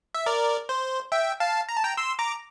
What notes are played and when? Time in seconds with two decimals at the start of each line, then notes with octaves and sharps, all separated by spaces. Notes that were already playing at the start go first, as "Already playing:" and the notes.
0.14 E5
0.26 A#4 D5
0.69 C5
1.12 E5 G5
1.40 F5 A5
1.69 A#5
1.76 A5
1.84 G5 A#5
1.97 C6 E6
2.19 A#5 D6